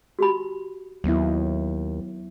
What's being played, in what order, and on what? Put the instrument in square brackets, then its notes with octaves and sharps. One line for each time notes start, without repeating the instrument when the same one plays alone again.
[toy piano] F#4 G4 B5
[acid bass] D#2 [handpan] F#3 B3 E4